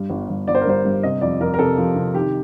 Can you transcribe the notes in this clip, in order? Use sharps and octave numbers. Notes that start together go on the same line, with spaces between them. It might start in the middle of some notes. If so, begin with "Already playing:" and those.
Already playing: G2
G1
G1
G1 D5
C5
A#4
G2 C5
G2
C3 D#5
F2 D5
F2 A#4
A#4
C3 A4
F3
C3
D#3 G4